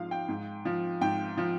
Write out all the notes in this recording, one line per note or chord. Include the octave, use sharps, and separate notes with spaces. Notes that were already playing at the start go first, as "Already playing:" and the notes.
Already playing: G#2 F3 F5
G5
G#2
F3
G#2 G5
F3